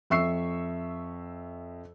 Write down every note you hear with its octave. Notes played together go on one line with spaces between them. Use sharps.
F2 E5 C#6 E6 C7